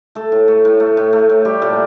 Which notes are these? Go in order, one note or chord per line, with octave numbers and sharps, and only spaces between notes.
A3 A4
A2
A3
A2
A3
A2
A3
A2
G3 G4
A#2 A4